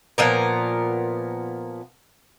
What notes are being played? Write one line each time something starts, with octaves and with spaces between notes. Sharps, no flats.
A#2 F3 B3 A#4